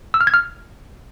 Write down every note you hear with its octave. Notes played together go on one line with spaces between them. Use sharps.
E6
F6
G#6
F6